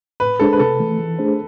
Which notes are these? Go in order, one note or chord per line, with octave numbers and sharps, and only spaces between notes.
A2 B4
G#3 D4 G#4 A4 C5
B4
C3 A4
E3 A3
E3
A3 D4 G#4 C5